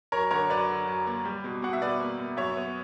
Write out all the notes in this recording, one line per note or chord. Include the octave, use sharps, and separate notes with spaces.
F#2 A#4 C#5
D3 A#4 C#5
F#2 B4 D5
D3
F#2
A#3
G3
B2
B2 F#5
E5
B2 B4 D5
A#3
A#3
F#2 C#5 E5
B3